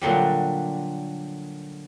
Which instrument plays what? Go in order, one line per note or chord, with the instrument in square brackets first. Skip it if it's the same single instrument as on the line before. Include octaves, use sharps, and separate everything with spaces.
[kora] A#2 D3 F#3 G3